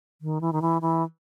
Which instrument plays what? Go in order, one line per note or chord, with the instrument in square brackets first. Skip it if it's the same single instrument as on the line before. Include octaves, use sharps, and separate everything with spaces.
[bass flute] D#3
E3
D#3
E3
E3